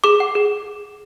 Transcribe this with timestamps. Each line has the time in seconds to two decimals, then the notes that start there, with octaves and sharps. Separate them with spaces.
0.04 G#4 D6
0.20 F#5
0.35 G#4